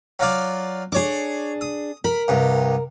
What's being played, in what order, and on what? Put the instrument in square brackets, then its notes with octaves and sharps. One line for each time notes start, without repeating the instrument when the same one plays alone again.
[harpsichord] F#3 F4 D5
[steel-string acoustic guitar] D4 G#4 [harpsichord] C#5 D6
[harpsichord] D#6
[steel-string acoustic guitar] A#4 [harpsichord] B5
[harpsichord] C2 G2